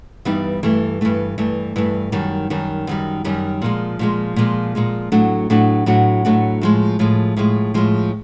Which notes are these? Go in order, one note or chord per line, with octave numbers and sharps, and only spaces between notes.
G2 E3 G3 B3 D#4
G2 E3 A3
G2 E3 A3
G2 E3 A3
G2 E3 A3
F#2 D#3 G3
F#2 D#3 G3
F#2 D#3 G3
F#2 D#3 G3
A#2 F3 G#3
A#2 F3 G#3
A#2 F3 G#3
A#2 F3 G#3
A2 F#3 A3 D4 F#4
A2 F#3 A3 D4 F#4
A2 F#3 A3 D4 F#4
A2 F#3 A3 D4 F#4
A2 F3 G#3
A2 F3 G#3
A2 F3 G#3
A2 F3 G#3